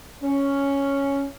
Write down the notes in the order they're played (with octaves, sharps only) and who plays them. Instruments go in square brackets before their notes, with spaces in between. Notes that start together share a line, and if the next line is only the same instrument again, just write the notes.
[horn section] C#4